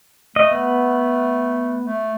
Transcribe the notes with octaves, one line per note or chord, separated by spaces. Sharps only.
A3 D#5
B3
A3